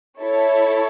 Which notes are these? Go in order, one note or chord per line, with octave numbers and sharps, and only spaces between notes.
E4 A4 C#5